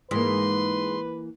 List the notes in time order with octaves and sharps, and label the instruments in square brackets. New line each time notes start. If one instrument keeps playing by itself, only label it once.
[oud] G#2 [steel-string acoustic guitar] E3 A#3 [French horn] B4 [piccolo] C6